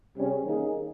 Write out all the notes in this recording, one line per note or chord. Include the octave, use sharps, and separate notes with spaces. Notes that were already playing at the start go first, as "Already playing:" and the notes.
C3 G3 C#4 G#4
D#3 A#3 D#4 G#4